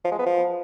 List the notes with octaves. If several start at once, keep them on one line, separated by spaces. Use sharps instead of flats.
F3
G#3
B3
F3